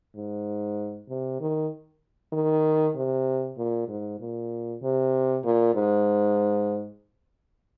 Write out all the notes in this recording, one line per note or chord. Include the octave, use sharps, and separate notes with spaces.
G#2
C3
D#3
D#3
C3
A#2
G#2
A#2
C3
A#2
G#2